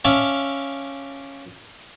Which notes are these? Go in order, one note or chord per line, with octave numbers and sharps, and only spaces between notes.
C#4 D5 E5 F5 A5